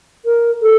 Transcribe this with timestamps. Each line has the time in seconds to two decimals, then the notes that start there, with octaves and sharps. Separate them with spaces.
0.25 A#4
0.62 A4